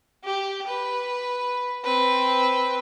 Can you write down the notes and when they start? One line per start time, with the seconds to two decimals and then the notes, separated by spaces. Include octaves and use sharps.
0.25 G4
0.67 B4
1.85 C4 B4